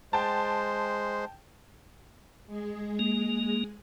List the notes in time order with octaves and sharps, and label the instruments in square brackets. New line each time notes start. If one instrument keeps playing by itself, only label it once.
[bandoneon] G#3 C5 [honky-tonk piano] G5 A5
[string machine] G#3 G#4
[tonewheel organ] A#3